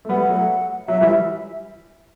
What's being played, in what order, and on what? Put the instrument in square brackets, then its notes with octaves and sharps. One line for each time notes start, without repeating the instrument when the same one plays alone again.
[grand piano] A3
[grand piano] G3 B3 [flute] F#5
[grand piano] F#3 A3
[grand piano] F#3 [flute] E5
[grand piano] E3 G3 [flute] E5